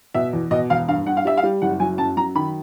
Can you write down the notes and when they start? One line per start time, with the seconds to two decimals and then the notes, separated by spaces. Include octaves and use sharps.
0.14 B2 E5
0.33 E2
0.51 B2 D#5
0.70 E1 F5
0.88 G2 F5
1.06 G2 F#5
1.17 F5
1.25 G3 E5
1.37 F5
1.43 G3
1.62 F#1 F#5
1.80 F#3 G#5
1.98 F#2 A5
2.17 F#3 A#5
2.35 D#3 B5